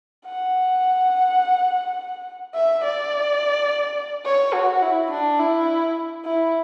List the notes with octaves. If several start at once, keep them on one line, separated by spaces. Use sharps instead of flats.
F#5
E5
D5
C#5
F#4
E4
D4
E4
E4